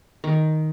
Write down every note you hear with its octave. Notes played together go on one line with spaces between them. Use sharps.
D#3